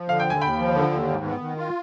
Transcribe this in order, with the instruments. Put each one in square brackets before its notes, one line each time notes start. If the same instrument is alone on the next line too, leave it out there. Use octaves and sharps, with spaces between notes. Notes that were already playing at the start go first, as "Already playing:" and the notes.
Already playing: [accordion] F3
[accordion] D3 [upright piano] F5
[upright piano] G5
[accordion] D#2 [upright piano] G#5
[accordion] D#2 [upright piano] G5 B5
[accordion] F3
D3
D#2
G#2
B3
D#3
F4